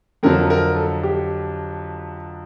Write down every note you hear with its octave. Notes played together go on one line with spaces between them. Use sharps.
F2 D3 F#3 A#4
A#4
A4
G4